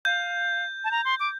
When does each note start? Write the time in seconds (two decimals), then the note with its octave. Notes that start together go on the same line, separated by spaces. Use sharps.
0.05 F5 G6
0.84 A5
0.91 A#5
1.05 C6
1.20 D6